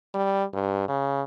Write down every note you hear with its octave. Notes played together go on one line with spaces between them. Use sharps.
G3
G2
C#3